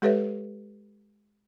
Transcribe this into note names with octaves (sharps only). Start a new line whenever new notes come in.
G#3 G4 A4 B4 C#5 E5